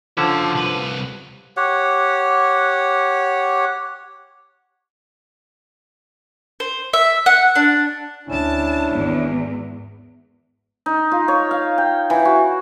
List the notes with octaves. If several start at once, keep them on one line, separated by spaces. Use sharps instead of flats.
D3 F3 C#4 F#4 A5
C2 B4
G4 C#5 F#5
C5
E5
F#5
D4
D2 C#4 D4 E4 A5
G#1 E2
D#4
F4
C#5
F5
G5
E3
F#4